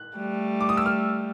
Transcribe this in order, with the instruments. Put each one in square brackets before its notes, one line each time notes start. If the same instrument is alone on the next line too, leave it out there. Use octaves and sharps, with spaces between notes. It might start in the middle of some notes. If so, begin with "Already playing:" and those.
Already playing: [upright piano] F#6
[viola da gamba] G3 A3
[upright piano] D6
D#6
E6
F6